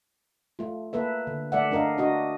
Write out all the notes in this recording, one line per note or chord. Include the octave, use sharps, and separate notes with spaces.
A3 F4
A#3 A4 B4 E5
D3
A3 A4 D5 E5 F#5
A3 D4 A#4 D#5 F5
D4 F#4 D#5